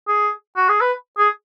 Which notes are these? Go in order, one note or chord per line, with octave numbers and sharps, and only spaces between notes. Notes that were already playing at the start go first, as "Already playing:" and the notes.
G#4
F#4
G#4
B4
G#4